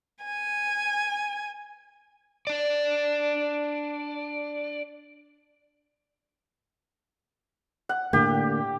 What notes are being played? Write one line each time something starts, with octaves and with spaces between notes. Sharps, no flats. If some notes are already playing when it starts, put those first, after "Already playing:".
G#5
D4 D5
F#5
A2 D3 A#3 G4